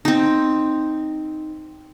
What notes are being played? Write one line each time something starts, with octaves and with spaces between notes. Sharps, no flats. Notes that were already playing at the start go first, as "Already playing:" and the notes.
C4 D#4